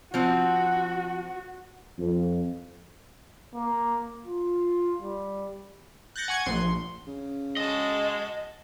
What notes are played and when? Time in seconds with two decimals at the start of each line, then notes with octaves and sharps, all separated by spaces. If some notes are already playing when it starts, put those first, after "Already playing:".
0.14 F3 C4 F#4
1.99 F2
3.54 A#3
4.26 F4
5.02 G3
6.16 F#6 G6 A6 A#6 C#7
6.28 F#5 G#5 C#6 G#6 C#7
6.46 A#1 C6
7.07 C#3
7.57 G#3 F#4 A4 D#5